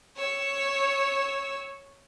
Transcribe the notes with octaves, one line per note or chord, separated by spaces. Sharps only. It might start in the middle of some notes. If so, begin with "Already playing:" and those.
C#5 E6